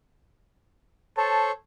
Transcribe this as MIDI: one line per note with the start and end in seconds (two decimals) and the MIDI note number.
1.17 1.51 69
1.17 1.51 72
1.17 1.51 73
1.17 1.46 81